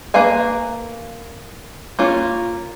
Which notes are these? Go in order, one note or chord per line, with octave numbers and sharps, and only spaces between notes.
A#3 B4 F5 G#5
A#3 C#4 F4